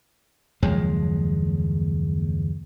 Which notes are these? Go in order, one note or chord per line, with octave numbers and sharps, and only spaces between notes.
F#1 D#2 F3 G#3